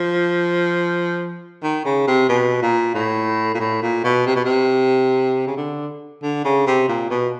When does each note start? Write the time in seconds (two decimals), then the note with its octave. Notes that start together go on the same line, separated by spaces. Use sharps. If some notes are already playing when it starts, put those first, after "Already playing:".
Already playing: F3
1.63 D#3
1.85 C#3
2.08 C3
2.29 B2
2.62 A#2
2.95 A2
3.54 A#2
3.60 A2
3.82 A#2
4.04 B2
4.26 C3
4.36 B2
4.45 C3
5.47 C#3
5.57 D3
6.23 D3
6.45 C#3
6.67 C3
6.88 A#2
7.10 B2